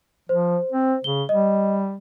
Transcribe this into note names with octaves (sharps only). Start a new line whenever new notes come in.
F3 C5
C4
C#3 G7
G3 D#5